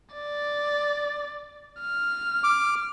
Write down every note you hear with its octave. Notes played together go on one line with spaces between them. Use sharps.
D5
F6
D6